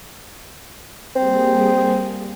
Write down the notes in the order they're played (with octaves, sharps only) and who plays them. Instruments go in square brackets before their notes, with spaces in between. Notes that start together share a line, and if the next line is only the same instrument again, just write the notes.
[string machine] G3 A#3 G#4 [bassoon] C4